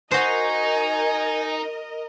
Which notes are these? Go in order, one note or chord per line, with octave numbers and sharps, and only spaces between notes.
D#4 F#4 A#4 C5 D#5 G#5